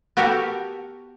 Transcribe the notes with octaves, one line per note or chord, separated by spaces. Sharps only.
B3 F#4 G4 A4 A#4